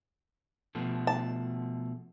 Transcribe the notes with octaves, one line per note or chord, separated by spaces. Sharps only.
B2 F3 A3
A5